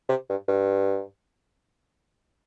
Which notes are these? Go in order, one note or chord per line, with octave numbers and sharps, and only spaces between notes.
C3
G2
G2